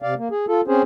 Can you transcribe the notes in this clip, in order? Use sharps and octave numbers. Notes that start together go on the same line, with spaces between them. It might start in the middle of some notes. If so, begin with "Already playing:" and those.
C3 D5 F5
A#3
G#4
F4 A4
C4 C#4 G#4 C5